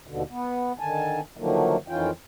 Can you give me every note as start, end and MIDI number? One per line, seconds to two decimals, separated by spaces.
0.07 0.23 39
0.07 0.23 47
0.07 0.23 50
0.30 0.72 59
0.79 1.20 50
0.79 1.20 51
0.79 1.20 80
0.79 1.20 81
1.37 1.76 50
1.37 1.76 51
1.37 1.76 53
1.37 1.76 54
1.37 1.76 57
1.37 1.76 58
1.88 2.11 41
1.88 2.11 51
1.88 2.11 52
1.88 2.11 61
1.88 2.11 65
1.88 2.11 79